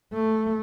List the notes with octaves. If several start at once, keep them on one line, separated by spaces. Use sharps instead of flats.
A3